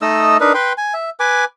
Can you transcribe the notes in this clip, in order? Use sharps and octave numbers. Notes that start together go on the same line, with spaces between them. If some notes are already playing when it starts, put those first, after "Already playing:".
A3 D#4 D#5 E6
D4 D#4 A#4 B4
B4 G5 C6
G#5
E5
B4 G#5 D6